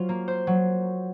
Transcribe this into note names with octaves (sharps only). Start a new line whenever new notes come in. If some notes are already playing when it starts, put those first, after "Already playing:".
Already playing: F#3 F4 C5
A#3
C5
F#3